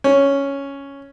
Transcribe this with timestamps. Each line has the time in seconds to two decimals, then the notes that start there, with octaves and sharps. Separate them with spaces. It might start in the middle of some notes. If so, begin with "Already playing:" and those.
0.04 C#4